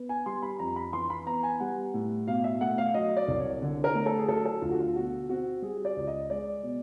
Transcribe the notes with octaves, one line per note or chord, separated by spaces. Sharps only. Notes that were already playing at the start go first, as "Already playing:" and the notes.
Already playing: B3
G#5
G3 C6
B5
F2 A#5
B5
E3 C6
B5
B3 A#5
G#5
G3 F#5
A2
B2 F5
E5
A3 F#5
F5
F#3 D#5
D5
C2
C#5
D3
A#4
A3
A4
G#4
F#3 A4
A4
D2 F4
F#4
F4
B2 F#4
C4 F#4
G3 G#4
D5
C#2
D#5
G#3 D5
B2